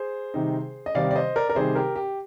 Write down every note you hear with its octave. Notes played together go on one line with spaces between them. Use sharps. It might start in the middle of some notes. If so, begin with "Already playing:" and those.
Already playing: G#4 C5
C3 D#3 G3 C4 D#4
D#5
C3 D#3 G3 C4 D#4 D5 F5
D5
C5 D#5
A#4 D5
A#4
C3 D#3 G3 C4 D#4 G#4 C5
G4 A#4
G4